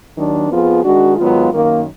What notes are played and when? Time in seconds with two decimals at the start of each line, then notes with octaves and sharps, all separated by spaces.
0.16 D#2 D#3 F#3 D4
0.49 F2 F3 B3 F4 G#4
0.83 D#3 G#3 D4 F#4
1.17 G#2 D#3 F#3 B3 F4
1.52 F#2 D#3 A#3